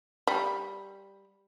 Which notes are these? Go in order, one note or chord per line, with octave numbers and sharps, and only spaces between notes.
G3